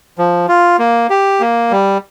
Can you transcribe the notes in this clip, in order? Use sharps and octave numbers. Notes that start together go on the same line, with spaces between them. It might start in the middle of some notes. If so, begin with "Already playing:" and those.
F3
F4
A#3
G4
A#3
G3